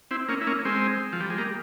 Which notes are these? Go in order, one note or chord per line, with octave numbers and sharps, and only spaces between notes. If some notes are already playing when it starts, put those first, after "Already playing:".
C4 E4
A#3 C#4
E4
A#3 C#4
G#3 C4
F3
G3
G#3
G3 A#3